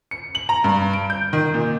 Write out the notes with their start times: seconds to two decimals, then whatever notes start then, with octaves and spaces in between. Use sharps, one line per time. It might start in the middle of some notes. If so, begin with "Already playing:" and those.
0.11 C#7
0.35 F#7
0.49 A#5
0.64 G2
0.93 D7
1.10 G6
1.33 D#3
1.54 A#2